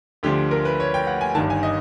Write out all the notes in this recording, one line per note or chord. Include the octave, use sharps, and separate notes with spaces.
D2 D3 F3 G4
A#4
B4
C#5
G5
F#5
G#5
G1 G2 D#3 A5
G#5
D#5